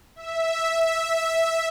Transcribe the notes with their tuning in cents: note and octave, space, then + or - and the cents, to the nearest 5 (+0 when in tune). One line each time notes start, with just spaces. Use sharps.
E5 -5